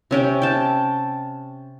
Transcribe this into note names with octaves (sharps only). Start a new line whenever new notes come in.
C3 C#4 G5
G5 A5